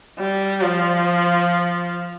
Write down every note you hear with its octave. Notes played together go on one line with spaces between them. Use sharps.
G3
F3